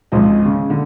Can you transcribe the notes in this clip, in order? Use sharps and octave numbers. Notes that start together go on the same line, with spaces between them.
G#1 C#2 F3 G#3 D#5
C#3
D3